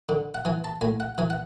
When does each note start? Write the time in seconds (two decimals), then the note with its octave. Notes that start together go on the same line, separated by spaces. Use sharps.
0.09 D3
0.34 F#5
0.45 E3 G#5
0.64 A5
0.81 A2 G#5
1.00 F#5
1.18 E3 G#5
1.30 F#5